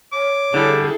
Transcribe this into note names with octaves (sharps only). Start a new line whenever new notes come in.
C#5 D6
D3 G3 E4 G#4 A4